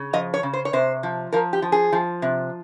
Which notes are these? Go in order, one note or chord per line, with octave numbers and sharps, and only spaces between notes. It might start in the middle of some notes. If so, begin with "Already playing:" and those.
Already playing: C#3
F3 D#5
C#5
C#3
C5
C#5
C3 C5
F3
F3 A#4
G4
F3
G#4
F3
C3